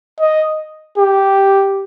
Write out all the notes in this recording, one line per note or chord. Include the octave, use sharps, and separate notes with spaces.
D#5
G4